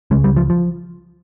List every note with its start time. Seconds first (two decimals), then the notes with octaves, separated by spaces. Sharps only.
0.11 C#3 G#3
0.15 C#2
0.24 G3
0.36 F3
0.50 F3